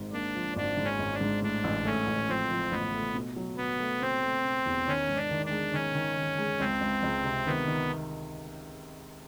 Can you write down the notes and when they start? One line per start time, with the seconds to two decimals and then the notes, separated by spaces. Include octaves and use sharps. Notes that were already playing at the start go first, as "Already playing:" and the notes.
Already playing: G#1 G#2
0.13 A#3 D4
0.35 F3
0.56 G#1 D4
0.77 G#2
0.84 C#4
0.99 G#1
1.14 D4
1.21 G#2
1.42 A2 D4
1.64 A1
1.85 A3 C#4
2.07 A1
2.29 F3 C4
2.51 F3
2.71 A1 B3
2.94 A3
3.15 B2
3.36 F#3
3.57 B2 B3
3.80 A3
4.01 B2 C4
4.23 A3
4.45 B2
4.66 E2
4.88 D#3 C#4
5.09 G#2
5.17 D4
5.31 D#3
5.45 D4
5.51 G#3
5.73 D#3 C#4
5.95 D#3
6.17 D#3
6.38 G#3
6.60 C#2 C4
6.81 C#2
7.03 C#2
7.24 C3
7.46 D#3 B3
7.68 D#3